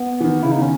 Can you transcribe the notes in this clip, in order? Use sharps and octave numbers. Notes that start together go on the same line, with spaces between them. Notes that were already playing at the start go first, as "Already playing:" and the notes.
Already playing: B3
E3
D#3
C#3 E4
D#4
D#3 C#4